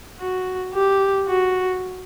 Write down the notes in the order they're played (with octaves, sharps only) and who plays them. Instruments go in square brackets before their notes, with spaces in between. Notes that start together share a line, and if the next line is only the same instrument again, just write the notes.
[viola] F#4
G4
F#4